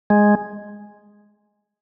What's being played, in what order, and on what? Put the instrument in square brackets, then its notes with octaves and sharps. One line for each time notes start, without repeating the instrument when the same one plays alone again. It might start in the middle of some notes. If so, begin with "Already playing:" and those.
[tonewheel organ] G#3